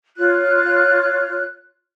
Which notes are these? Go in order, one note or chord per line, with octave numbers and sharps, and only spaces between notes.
F4 C#5 F#6